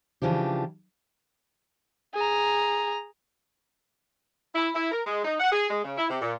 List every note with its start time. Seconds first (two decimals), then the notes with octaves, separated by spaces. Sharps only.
0.22 C#3 E3 F3 D4 G4
2.15 G#4 A#5
4.54 E4
4.75 E4
4.92 A#4
5.06 G#3
5.25 D#4
5.40 F#5
5.52 G#4
5.70 G#3
5.84 C#3
5.98 E4
6.10 C3
6.21 A#2